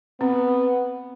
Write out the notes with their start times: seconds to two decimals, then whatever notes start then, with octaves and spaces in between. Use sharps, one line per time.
0.21 B3 C4